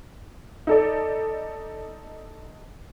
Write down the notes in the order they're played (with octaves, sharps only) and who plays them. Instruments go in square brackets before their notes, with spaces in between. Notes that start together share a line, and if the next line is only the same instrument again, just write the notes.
[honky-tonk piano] D#4 A4 D5